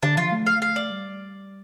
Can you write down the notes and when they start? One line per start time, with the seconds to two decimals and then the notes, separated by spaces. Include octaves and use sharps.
0.03 D3 D4
0.17 F3 F4
0.32 A3
0.47 F5
0.62 F5
0.76 D5
0.90 G3